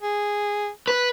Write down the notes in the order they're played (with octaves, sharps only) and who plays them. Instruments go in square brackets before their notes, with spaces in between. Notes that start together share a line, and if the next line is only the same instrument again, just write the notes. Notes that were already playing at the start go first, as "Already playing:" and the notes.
[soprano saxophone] G#4
[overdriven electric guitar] B4